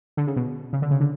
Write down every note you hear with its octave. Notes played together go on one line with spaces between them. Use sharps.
D3
C#3
B2
C#3
D3
C#3
D3